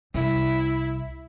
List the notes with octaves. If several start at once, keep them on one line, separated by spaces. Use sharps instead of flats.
C2 E4